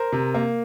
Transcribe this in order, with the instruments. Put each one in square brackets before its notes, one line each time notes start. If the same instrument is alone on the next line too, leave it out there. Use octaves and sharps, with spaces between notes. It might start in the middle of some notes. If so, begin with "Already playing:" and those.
Already playing: [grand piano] A#4 C5
C3
A#3